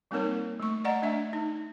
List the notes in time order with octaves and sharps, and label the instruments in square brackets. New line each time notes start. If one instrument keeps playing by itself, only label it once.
[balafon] G3 A#3 C4 D#4 A#4 C#5
A3 C#6
D5 D#5 F#5 A#5
A3 D4 E5
D#4